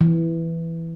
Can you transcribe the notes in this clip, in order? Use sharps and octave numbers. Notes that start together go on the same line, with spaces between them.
E3